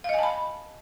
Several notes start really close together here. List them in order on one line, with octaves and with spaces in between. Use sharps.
F5 D#5 G#5 A5 B5